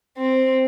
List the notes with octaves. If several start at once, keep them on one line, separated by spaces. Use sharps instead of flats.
C4